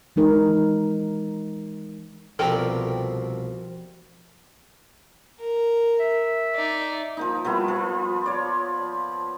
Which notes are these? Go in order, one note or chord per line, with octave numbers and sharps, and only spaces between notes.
E3 G#3 D#4 A#4
C2 B2 F3 C4 A4 A#4 D5 G5
A#4
E5
D#4 D5
F3 A#3 D#4
F3 G3 B3 E4
F3
C#5 D5